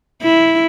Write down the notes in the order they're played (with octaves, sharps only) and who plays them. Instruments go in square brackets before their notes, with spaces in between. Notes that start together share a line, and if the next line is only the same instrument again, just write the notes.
[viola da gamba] E4